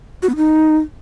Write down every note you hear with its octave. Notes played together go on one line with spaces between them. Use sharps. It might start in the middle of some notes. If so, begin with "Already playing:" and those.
F#4
B3
D#4